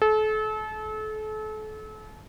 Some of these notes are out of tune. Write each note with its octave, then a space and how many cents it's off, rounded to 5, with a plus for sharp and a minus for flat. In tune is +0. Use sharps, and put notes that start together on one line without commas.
A4 -35